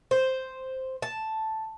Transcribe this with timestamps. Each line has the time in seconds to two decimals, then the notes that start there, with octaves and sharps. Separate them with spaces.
0.11 C5
1.02 A5